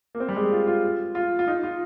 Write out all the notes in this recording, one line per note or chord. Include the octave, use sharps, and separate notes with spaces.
A#3
C4
G3
G#3
F4
F4
F4
F4
D#4
F4